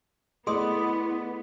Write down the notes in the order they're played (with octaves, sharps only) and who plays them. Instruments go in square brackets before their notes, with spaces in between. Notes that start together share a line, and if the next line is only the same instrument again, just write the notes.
[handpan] A3 D5 D#5 [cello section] B3 [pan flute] E4 [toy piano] G#4 C6 D#6